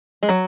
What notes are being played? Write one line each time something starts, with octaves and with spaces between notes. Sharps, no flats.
G#3
F#3